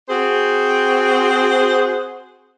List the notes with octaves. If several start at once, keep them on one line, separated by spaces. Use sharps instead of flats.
C4 F#4 G#4 C5